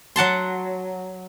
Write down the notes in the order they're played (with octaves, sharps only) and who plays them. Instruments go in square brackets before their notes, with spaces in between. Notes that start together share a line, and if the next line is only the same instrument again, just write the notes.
[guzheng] F#3 F#5 A5 C6